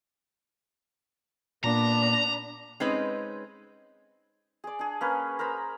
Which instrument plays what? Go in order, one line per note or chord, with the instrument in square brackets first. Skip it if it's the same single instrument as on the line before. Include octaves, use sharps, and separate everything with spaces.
[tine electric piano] A#2 A#3 [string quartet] B3 D4 [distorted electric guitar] A#5
[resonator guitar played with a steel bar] G#3 C4 C#4 D#4 B4
[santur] G#4 D5
D4 G#4
A#3 C#4 B4
A#4 C5 A#5 B5